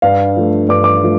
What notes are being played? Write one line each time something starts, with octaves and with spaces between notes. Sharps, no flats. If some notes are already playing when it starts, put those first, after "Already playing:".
G2 F5
F3 A3
G2 D6
D6
F3 A3